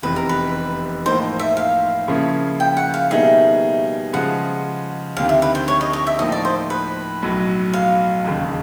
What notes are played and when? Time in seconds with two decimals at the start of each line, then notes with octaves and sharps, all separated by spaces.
0.02 F1 E2 C3 E3 B4
0.16 A#4
0.29 B4
1.06 A2 F3 A#3 D#4 C5
1.39 E5
1.57 F5
2.08 C#3 F3 A#3 C#4 E4
2.60 G5
2.77 F#5
2.94 F5
3.11 B2 G3 A#3 D#4 G#4 E5
4.13 C#3 F3 G#3 F#5
5.16 D2 C3 D#3 F5
5.29 E5
5.42 B4
5.55 C5
5.68 C#5
5.81 D#5
5.93 D#5
6.07 E5
6.19 A2 F3 A#3 D#4 D#5
6.32 D5
6.45 C5
6.70 B4
7.22 B1 A2 F#3
7.73 F5
8.24 E1 D#2 C#3